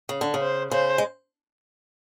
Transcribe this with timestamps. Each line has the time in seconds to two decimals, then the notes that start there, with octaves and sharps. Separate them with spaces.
0.09 C#3
0.21 D3
0.34 C#3
0.41 C5
0.71 C#3 C5
0.98 G#3